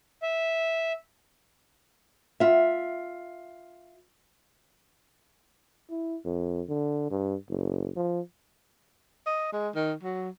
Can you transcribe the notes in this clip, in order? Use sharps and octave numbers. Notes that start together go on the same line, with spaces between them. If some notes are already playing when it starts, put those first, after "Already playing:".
E5
F4 E5
E4
F2
D3
G2
F#1
F3
D#5
G#3
D#3
F#3